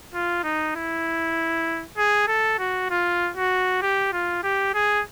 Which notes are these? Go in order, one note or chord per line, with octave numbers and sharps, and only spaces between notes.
F4
D#4
E4
G#4
A4
F#4
F4
F#4
G4
F4
G4
G#4